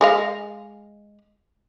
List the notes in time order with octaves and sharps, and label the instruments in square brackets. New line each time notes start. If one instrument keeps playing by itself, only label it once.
[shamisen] G#3 D#5 F5